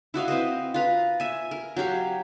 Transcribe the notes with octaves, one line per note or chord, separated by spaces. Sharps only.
E4 F#4 D#5 F5
C4 B4 C5 D#5
F4 B4 A#5
E5 G#5
A#4
F#3 F#4 G4 F5